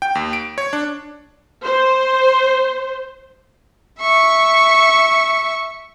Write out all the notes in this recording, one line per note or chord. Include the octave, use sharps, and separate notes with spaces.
G5
D#2
D7
C#5
D4
C5
E5 C#6